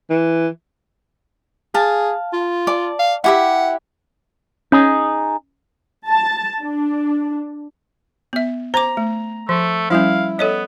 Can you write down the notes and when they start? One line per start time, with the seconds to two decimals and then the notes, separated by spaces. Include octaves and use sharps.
0.10 E3
1.74 G#4 F5 A5
2.33 F4
2.67 D5 A5
2.99 F5
3.24 E4 G4 E5 F#5
4.72 C#4 D#4 G#4
6.07 A5
6.62 D4
8.33 B3 E5
8.74 C5 A#5 D6
8.97 A3
9.49 F3 A3
9.90 F3 G3 C#4 E4 F5
10.39 B3 A4 C#5 D#5